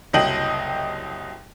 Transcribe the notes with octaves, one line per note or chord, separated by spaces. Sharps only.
F#1 C2 F#3 D#5 G5 F#7